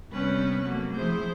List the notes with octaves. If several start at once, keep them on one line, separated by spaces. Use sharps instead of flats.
C3 G3 B3 C#4 B4
F#3 A3 A#3
F3 E4 G#4 C5 G6